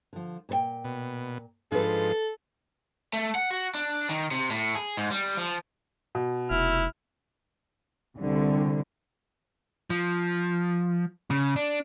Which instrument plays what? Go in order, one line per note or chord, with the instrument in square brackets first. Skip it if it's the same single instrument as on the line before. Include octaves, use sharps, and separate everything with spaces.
[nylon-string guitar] D3 F3
A#2 B4 G5
[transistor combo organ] B2
[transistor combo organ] G#2 F3 [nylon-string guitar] D4 B4 [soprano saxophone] A4
[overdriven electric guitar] A3
F#5
F#4
D4
D#3
C3
A2
G#4
G#2
G3
F3
[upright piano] B2
[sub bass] F1 [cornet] E4 [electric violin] F6
[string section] C2 D3
[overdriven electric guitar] F3
C#3
D4